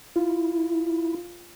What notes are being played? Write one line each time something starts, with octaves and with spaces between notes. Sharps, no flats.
E4 F4